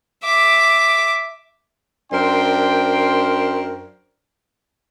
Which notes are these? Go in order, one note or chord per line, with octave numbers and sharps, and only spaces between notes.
E5 D6
F#2 D4 A#4 C5 G5 C6